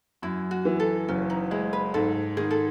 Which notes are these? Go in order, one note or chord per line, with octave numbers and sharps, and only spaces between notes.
F#2 E4
F#4
E3
A4
F#1 C#4
D#4
G#3 E4
B4
G#2 A4
D#3 G#4
A4